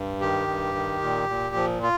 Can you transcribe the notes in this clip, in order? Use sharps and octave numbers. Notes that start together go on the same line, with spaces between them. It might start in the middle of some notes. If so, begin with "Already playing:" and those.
Already playing: G2
D#3 G4
G2
D#3
A#2
A#2
F3
F4